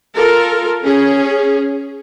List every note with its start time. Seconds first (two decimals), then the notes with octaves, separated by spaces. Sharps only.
0.15 F4 A4 A#4
0.83 C#4 G#4